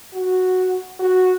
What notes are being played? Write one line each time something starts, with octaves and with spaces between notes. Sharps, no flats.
F#4
F#4